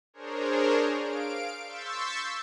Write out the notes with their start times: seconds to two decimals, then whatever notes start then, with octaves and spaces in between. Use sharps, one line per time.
0.14 D4 G#4 A#4 C5 C#5
0.97 F5 D7
1.64 C6 C#6 E6 G6 A6 B6